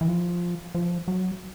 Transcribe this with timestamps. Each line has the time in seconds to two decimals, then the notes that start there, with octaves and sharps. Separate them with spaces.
0.01 E3
0.08 F3
0.75 F3
1.08 F#3